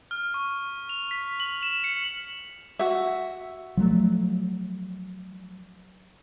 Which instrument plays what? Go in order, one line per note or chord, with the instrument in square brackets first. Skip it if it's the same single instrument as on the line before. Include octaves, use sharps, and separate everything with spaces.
[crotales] F6
C#6
F7
B6
F#7
E7
C#7
[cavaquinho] F#4 E5
[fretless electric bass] F3 F#3 A3